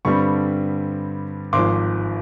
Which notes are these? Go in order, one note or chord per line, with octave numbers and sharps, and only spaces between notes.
G2 D3 G3 C4 B5 C#6
G#1 G#2 F3 C6 D6